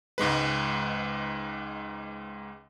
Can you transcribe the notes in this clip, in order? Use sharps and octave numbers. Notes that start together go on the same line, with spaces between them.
C#2 G#2 G#3 B4